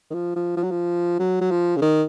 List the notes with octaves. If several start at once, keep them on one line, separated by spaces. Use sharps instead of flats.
D#3
F3
F3
F3
F#3
F3
F#3
F#3
F3
C#3
D#3